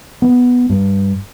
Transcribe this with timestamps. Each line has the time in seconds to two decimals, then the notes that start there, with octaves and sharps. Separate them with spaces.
0.22 B3
0.70 G2